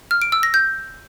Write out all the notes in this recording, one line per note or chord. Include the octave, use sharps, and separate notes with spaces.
F6
D7
E6
A#6
G6